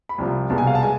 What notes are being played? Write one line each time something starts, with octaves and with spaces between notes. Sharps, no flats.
B5
C2 C3 F3
C2 B2 G#3 A5
G#5
F5
A5
G#3 G#5